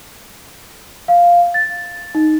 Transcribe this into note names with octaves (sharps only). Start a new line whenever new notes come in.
F5
A6
D#4